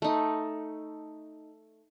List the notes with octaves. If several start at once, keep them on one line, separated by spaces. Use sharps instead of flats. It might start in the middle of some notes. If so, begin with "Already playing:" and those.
A3 D#4